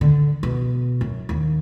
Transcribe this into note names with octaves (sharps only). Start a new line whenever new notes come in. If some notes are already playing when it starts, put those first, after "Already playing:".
D3
B2
F#2
D#2